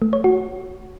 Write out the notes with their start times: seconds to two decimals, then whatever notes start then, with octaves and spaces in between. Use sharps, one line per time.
0.02 A3
0.13 C#5
0.24 F#4